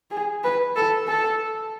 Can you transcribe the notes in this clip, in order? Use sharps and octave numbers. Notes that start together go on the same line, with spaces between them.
G#4
B4
A4
A4